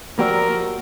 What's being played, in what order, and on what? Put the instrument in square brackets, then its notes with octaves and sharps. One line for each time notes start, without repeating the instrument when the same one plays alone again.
[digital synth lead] F3 [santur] F#3 E6 [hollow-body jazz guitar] A#3 G4 D5 [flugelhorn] A#4